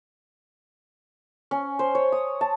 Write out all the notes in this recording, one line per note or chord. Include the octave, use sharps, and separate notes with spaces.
C#4
C5
C#5
D#6
A5